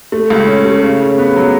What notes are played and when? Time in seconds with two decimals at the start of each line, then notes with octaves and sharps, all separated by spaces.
0.12 A3
0.30 C#2
0.47 C#4
0.65 A3
0.83 C#3
1.01 C#3
1.18 B3
1.36 F#3